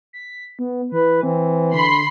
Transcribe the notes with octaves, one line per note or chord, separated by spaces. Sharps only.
B6
B3
E3 B4
E3 C4
D3 B5 C6 C7